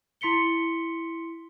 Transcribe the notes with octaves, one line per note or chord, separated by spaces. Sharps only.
E4 C6 B6 C#7 G7